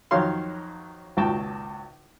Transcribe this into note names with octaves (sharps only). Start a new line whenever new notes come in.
F2 D#3 F#3 C#5 F5 C6
G#1 C#2 A#2 F#4 G5 A5